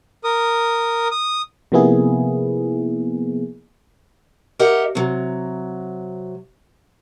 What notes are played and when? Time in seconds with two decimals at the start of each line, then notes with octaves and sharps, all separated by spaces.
0.24 A#4 D#6
1.11 D#6
1.72 C3 F3 A#3 B3 E4 G#4
4.59 G4 A#4 D#5 E5 F#5
4.95 C3 F#3